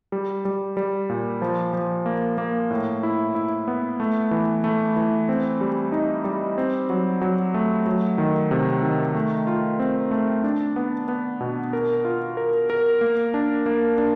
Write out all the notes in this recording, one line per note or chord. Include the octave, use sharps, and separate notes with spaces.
G3
G3
G3
A#2
F3
F3
A#3
A#3
A2
E4
E4
B3
A3
E3
A3
E3
C4
G3
D#4
G3
C4
F#3
F#3
A3
F#3
D#3
C3
D#3
A3
F4
C4
A3
D4
B3
B3
B2
A#4
F4
A#4
A#4
A#3
D4
A#3
D4